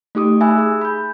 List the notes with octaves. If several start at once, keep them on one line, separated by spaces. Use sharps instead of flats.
A3 D#4 G4 D6 D#6
E5 G#5 B5 E6 F#6
G#4
B5 G6